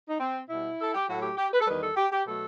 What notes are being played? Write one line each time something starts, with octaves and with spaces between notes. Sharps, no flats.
D#4
C4
B2 G3 E4
A4
G4
A2 F#3 A3 F#4
G4
G4
B4
A4
E2 D#3 G3 B4
A4
G4
G4
B2 F#3 A3 A4